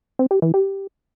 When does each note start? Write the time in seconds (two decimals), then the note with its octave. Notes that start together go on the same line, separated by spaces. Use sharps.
0.19 C4
0.31 G4
0.42 E3
0.54 G4